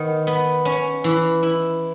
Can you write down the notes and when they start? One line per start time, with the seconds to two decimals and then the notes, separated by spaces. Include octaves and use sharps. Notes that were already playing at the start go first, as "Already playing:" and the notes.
Already playing: D#3 B3
0.27 B3
0.65 C#4
1.04 E3
1.43 E4